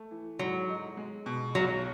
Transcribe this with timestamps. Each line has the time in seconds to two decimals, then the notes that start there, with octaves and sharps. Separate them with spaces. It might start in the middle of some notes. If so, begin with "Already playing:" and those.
Already playing: A3
0.11 E3
0.39 G#2 F#3
0.69 D#4
0.97 G#3
1.26 B2
1.55 B1 F#3